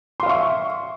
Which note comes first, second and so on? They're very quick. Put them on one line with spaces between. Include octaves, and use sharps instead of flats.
C6 F5 E5 C#6